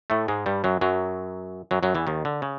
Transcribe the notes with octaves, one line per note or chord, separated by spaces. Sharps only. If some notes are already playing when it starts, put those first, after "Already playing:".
A2 A3
G#2 G#3
G2 G3
F#2 F#3
F#2 F#3
F#2 F#3
F#2 F#3
E2 E3
D#2 D#3
D3
C#3